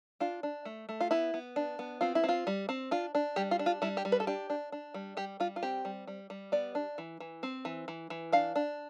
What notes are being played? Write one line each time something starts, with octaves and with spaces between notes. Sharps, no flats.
D4 F4
D4
A3
A3
F4
B3 E4
B3
D4
B3
C4 F4
E4
C4 F4
G3
C4
D4 F4
D4
G3 G4
F4
D4
F4
G3 E4
G4
G3
B4
A4
D4 G4
D4
D4
G3
G3 G4
G3 F4
F4
C4 G4
G3
G3
G3
B3 D5
D4
E3
E3
C4
E3
E3
E3
D4 F5
D4